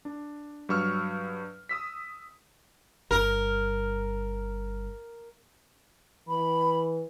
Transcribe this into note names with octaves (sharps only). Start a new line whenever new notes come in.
D4
G2 F#3 C#6 E6 F6
D#6 E6 B6
G1 G2 A#4
E3 B5